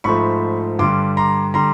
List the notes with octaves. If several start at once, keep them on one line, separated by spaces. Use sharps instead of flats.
G#2 F3 A3 B5 C#6
G2 D3 G3 C6 D6
A#5 C6
D3 G3 A#5 C6